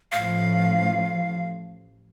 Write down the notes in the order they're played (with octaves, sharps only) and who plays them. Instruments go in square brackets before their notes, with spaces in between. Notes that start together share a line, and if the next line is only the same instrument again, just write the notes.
[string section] A1 A2 F3 [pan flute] F5